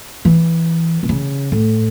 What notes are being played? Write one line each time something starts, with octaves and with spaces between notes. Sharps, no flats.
E3
B2
C#3
A2